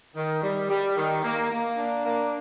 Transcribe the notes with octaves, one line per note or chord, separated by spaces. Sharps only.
D#3
G3
G3
D#3
A#3
A#3
D4
A#3